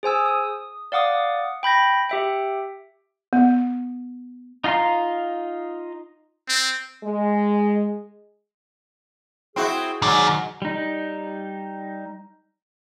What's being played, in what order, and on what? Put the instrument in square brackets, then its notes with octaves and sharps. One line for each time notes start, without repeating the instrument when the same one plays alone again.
[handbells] G#4 C5 G#5 E6
D#6
D5 F5 F#5 D6 D#6
G5 B5 G6 A#6
G4 E5 G5
[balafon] B3
[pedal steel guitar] D#4 F4 F5 A#5 C6
[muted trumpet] C4
[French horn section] G#3
[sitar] C4 E4 F#4 [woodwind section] G#4
[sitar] G#2 F#3 [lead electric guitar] D#3 D5
[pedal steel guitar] G3 D#4